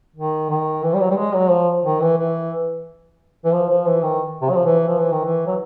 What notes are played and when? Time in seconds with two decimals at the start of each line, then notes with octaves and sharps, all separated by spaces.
0.16 D#3
0.50 D#3
0.83 E3
0.94 G3
1.00 F#3
1.10 G3
1.17 G#3
1.35 F#3
1.51 F3
1.85 D#3
2.01 E3
2.18 E3
3.45 E3
3.53 F3
3.69 F3
3.87 E3
4.03 D#3
4.42 C3
4.50 F#3
4.57 F3
4.65 E3
4.88 F3
4.99 E3
5.12 D#3
5.25 E3
5.47 F#3